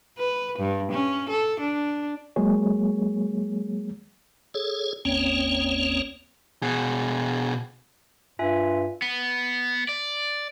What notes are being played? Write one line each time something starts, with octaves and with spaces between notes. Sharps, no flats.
B4
G2
C#4
A4
D4
F#3 G#3 A#3 G#4 C#5
G#4 A4 C#5
G1 D#2 A#3 C4 C#4 C#5
B2 G#4
G2 F4 E5 G#5
B3
D5